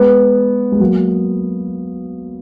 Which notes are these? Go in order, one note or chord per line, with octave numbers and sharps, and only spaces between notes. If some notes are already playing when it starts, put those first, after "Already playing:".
Already playing: G#3 B3
G#3
F#3 A#3